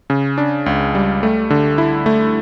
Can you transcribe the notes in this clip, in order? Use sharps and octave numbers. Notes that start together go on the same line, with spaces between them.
C#3
D4
C#2
G3
A3
D3
E4
A3